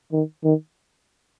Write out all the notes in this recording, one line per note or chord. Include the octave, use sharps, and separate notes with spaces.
D#3
D#3